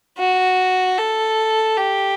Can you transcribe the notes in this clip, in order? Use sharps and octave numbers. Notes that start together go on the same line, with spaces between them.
F#4
A4
G4